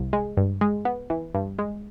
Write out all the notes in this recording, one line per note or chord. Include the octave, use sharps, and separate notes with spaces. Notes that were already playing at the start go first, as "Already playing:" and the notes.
Already playing: C2
G#3
G2
G#3
B3
E3
G2
G#3